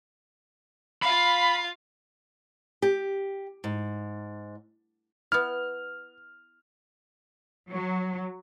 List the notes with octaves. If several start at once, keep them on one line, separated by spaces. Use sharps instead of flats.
F4 F5 B5
G4
G#2
B3 E4 F6
F#3